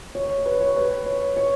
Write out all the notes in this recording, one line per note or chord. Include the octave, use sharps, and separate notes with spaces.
C#5
C#5
B4
C#5
B4
C#5
C#5